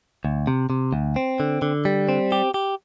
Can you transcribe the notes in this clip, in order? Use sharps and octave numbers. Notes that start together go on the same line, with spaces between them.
D2
C3
C3
D2
C4
D3
D3
G3
C4
G4
G4